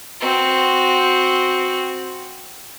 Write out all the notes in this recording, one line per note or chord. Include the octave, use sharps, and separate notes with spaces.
C4 F#4